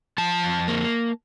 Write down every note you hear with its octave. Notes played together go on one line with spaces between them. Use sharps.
F3 A5
F2
A#3